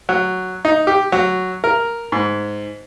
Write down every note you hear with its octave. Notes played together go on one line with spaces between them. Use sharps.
F#3
D#4
G4
F#3
A#4
G#2